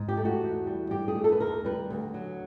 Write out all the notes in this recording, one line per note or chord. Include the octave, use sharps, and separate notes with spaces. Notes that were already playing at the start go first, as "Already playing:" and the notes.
Already playing: G#2
G4
A3
F#4
E2
G3
G2 G4
G#4
A3
A4
B4
D#2 A#4
G3 B4
D2
F#3